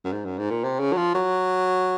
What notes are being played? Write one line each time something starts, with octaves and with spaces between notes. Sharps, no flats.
F#2
G#2
F#2
G#2
A#2
C3
C#3
F#3
F3
F#3